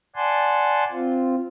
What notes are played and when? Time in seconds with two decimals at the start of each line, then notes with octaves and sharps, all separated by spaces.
0.16 D5 F#5 G#5 A5 C6
0.91 C4 F4